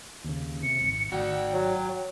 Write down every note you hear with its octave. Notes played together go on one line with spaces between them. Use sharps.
D#2 C#3
C3 C#7
D#1 G#1
G#1 F#4 D5 G5
F#3